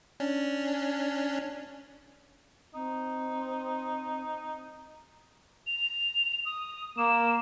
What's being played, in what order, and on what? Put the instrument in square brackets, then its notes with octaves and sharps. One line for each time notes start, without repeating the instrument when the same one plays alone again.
[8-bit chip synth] C#4 D4
[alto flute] C4 [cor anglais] D#4
[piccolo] F7
D#6
[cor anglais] A#3 [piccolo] E7